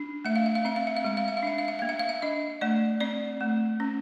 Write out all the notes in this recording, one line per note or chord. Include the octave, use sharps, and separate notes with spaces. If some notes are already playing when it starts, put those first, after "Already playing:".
Already playing: D4
A3 E5
F5
E5
F5
C4 E5
F5
E5
F5
G#3 E5
F5
E5
F5
D4 E5
F5
E5
A#3 F5
E5
F5
E5
D4 D#5
A3 D5
C4 D5
A3
C#4